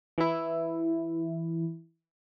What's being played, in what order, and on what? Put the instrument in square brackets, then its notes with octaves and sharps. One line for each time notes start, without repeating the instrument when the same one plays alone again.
[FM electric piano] E3 E4